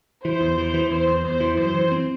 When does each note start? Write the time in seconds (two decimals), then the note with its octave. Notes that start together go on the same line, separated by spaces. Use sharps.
0.24 E3 C5
0.41 E2
0.58 E3
0.74 E3
0.90 E2 C5
1.07 E2
1.24 E2 C5
1.40 E3
1.57 F#2 C5
1.74 E3
1.92 C4